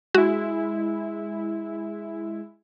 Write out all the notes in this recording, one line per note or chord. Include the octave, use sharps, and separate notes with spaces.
G#3 E4 F#4